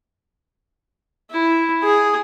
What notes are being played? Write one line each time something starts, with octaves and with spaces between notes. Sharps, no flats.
E4
G#4